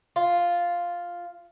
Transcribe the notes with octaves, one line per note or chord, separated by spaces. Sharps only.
F4